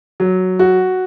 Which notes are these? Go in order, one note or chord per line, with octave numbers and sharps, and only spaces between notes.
F#3
F#4